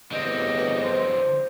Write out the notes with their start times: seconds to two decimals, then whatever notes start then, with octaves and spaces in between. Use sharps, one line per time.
0.11 A1 E2 G2 D3 C4 D#5
0.82 C5